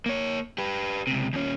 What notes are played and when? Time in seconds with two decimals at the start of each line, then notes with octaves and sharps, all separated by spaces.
0.06 A#3 C#5
0.58 G4 B4
1.07 C#2 C3
1.33 D#2 C#4